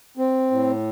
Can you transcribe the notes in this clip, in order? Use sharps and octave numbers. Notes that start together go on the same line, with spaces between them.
C4
A2